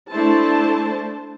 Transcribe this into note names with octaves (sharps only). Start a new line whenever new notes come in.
A3 D4 E4 C5 A5